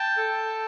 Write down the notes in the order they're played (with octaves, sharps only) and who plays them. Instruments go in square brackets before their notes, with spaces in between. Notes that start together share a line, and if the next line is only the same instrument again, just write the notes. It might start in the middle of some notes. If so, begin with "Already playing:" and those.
Already playing: [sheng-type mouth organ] G5 A5
A4